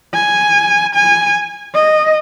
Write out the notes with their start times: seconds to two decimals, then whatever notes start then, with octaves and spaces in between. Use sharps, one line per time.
0.14 G#5
0.94 G#5
1.74 D#5